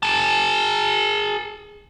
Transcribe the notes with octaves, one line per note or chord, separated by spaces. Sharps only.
G#4 A5